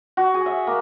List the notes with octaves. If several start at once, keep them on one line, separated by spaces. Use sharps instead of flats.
F#4
G#4
E5
A#3